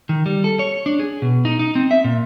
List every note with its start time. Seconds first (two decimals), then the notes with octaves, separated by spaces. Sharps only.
0.09 D#3
0.26 G3
0.44 A4
0.59 C#5
0.86 D4
1.00 G#4
1.22 B2
1.45 D#4
1.59 D#4
1.75 C4
1.91 E5
2.04 A#2